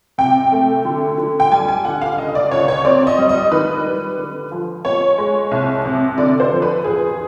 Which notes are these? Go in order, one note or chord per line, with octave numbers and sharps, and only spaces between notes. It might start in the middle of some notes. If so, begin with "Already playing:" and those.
C3 G5
A3
D3
D3
G5
G3 G#5
G#5
D3 F#5
F5
C#2 D#5
D5
C#2 C#5
C#5
C4 D5
D#5
G3
D#5
D#3 B4
G3
D3
F3
B3 C#5
G#3
C2
C3
D3 D5
C5
F3
B4
E2 G#4